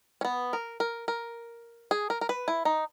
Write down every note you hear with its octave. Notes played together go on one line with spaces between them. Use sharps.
C#4
B3
A#4
A#4
A#4
G#4
A#4
A#4
B4
E4
D#4